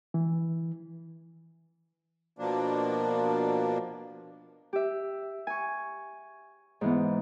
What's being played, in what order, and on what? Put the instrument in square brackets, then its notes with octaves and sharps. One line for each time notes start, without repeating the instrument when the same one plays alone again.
[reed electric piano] E3
[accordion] B2 F3 A#3 D4
[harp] G4 E5
G#5 C#6
G#2 E3 B3